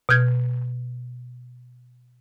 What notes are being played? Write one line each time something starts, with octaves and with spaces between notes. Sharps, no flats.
B2 F6 G6 G#6